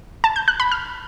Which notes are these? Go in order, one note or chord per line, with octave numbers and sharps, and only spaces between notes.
A5
G6
F#6
B5
F6